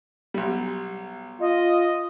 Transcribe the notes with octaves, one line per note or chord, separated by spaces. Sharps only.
B1 G3
F4 D#5